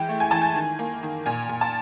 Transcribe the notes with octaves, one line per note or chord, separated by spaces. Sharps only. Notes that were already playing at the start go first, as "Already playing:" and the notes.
Already playing: E3 G#3 G5
A3
G#5
E3 A5
G#5
D#3
A#3
D#3
A#2 G#5
A#2
A5